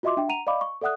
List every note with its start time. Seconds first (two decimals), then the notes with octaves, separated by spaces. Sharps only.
0.03 F4 F#4 D#5 E5 C6 D6
0.17 D4 E5 G5
0.29 F#5 A#5 D#7 F7
0.47 D5 D#5 F5 B5 D6
0.61 C#6
0.81 A4 D5 E5 F#5 D#6 F#6